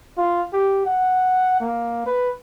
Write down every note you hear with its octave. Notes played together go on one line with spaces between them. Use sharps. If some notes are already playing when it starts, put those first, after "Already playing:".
F4
G4
F#5
A#3
B4